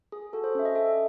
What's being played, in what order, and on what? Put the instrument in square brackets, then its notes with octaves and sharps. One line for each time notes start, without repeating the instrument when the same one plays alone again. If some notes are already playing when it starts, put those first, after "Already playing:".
[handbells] G#4
F#4 A4
C5
C#4 E5
D#5
A4 E5